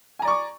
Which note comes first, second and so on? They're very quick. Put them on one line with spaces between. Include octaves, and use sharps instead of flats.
G#5 A#5 D5 C#6 D6